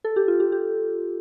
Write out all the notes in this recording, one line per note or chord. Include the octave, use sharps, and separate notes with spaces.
A4
G4
F4
G4
G4